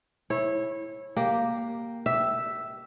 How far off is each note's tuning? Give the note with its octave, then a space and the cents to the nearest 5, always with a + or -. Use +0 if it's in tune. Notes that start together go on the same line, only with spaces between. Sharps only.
E4 -5 C#5 -25
A#3 +0 G4 +0
G4 -20 E5 +0